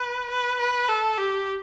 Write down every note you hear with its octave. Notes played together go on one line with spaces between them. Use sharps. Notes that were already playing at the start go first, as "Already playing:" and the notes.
Already playing: B4
B4
B4
A4
G4